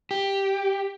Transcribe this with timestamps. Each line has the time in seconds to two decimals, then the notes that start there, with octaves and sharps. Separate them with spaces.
0.11 G4